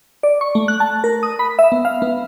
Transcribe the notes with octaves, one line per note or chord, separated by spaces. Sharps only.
D5
C#6
A3
F#6
A5
A#4
D#6
B5
E5
B3
F5
B3